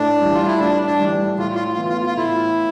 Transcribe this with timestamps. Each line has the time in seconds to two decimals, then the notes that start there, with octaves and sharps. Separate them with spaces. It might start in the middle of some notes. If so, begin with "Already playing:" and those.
Already playing: A2 D4
0.21 E3 G3
0.34 F4
0.47 E4
0.60 A2 D4
0.86 D4
0.99 E3 G3
1.38 A2 F4
1.55 F4
1.73 F4
1.78 E3 B3
1.89 F4
2.06 F4
2.17 A2 E4